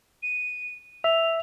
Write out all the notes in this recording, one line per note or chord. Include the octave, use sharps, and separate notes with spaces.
D#7
E5 F7